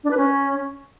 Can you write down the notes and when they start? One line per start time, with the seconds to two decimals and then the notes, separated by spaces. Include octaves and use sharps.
0.04 D4
0.10 B4
0.17 C#4